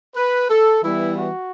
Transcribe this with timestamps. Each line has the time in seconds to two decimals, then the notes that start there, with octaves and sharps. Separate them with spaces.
0.15 B4
0.49 A4
0.83 E3 G3 B3 E4
1.16 F#4